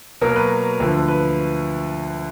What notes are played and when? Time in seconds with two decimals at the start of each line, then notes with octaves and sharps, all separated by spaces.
0.21 B2 F#3 A#3 A#4
0.36 B4
0.80 D2 D3 F3
1.08 B4